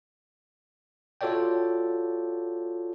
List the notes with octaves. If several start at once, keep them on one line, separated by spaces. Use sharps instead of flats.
F4 F#4 A4 C#5 D5 G5